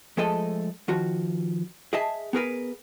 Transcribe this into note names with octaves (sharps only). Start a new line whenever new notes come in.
F3 G#3 A3 A4 D#5
D#3 F3 F#4
G#4 D#5 E5 A5
B3 G#4 A#4 B4